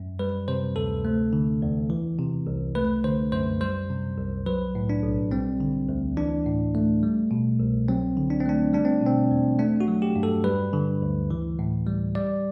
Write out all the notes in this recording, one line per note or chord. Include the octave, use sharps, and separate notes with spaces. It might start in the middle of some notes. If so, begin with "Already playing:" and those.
Already playing: F#2
G3 B4
C3 C5
D2 A4
A3
D3
E2
E3
C3
C2
A3 B4
D3 C5
F#2 C5
G3 C5
C3
C2
F#3 B4
A2
D4
B1
G3 C4
D3
D2
E3 D4
A2
A3
G3
B2
C2
F#3 C4
D3
D4
C4
A3 D4
G3 D4
C4
B2 C4
E2
A3 D4
F#4
F#3
G4
G2
A4
G3 B4
D3
D2
E3
A2
G3
G3 D5